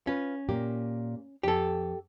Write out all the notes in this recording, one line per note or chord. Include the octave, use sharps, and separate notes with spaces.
C#4 F4 B4
A#2 A#3 G4
F2 G4 A4